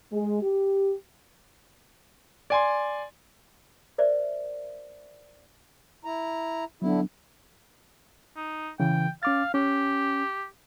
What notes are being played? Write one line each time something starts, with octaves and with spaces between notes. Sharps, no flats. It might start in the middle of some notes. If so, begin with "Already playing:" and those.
G#3
G4
D5 G#5 C6
A#4 C5 D5 E5
E4 A#5
D3 F#3 B3 D4 E4
D#4
C#3 E3 G5
C#4 F5 D6 A6
C#4 G4